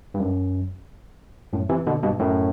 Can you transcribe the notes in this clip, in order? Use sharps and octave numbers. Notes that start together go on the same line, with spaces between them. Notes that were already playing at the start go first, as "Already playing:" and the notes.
G2
F#2
F#2 A2
C3 E3
B2 D3
G2 B2
F#2 A2